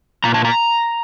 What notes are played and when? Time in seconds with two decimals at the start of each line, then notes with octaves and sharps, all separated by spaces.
0.24 A#2 A#5
0.34 A5
0.45 A#5